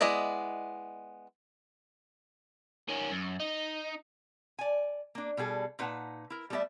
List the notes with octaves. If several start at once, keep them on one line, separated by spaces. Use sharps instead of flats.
G#3 B3 E4 D5 D#5
D#3 C#4
F#2
D#4
D5 G#5
A#3 D4
B2 G3 G#4 A4
A#2 D#4 B4 F#5 A5
E4 A#4
G3 A3 B3 A4 D5 E5